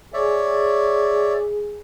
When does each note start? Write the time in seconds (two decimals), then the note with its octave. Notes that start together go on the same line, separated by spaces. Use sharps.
0.14 G#4 C#5 D5 E5